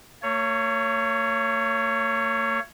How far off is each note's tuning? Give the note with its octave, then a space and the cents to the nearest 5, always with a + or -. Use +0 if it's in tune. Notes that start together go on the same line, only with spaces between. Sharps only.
A#3 -45 C#5 +5